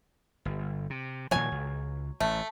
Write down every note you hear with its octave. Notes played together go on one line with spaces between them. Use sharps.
G1
C3
A#2 D#3 F3 F#3 G#5
C#2
A1 A3